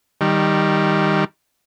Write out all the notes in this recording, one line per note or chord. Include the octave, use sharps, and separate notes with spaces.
D#3 G3